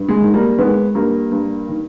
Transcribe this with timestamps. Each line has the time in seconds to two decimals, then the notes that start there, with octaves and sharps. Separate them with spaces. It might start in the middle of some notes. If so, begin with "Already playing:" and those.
Already playing: G2
0.08 G#3
0.21 D#3
0.34 G3 A#3
0.58 D#3 G#3 B3
0.95 G2 G3 A#3
1.32 G2
1.69 D#3